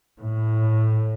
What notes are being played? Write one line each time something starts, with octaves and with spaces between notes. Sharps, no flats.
A2